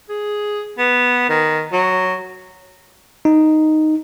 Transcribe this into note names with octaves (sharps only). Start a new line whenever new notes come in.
G#4
B3
D#3
F#3
D#4